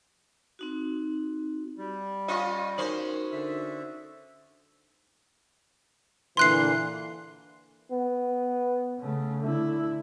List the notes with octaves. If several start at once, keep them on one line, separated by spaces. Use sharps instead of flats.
C4 D#4 F#4
G3
C#4 F4 D#5
C#4 D#4 F#4 A#4 C5
D3 E5
A#2 D3 E3 C6 F#6 C7
B3
C#3 A3
D3 A3 E4